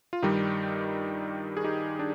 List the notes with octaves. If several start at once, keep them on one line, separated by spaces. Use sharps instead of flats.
F4
G2 D#3 G3 D#4 G4
G#4
D#4 G4
D4